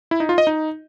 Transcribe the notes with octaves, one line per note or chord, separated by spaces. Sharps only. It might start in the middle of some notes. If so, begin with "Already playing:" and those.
E4
D#4
F4
D#5
D#4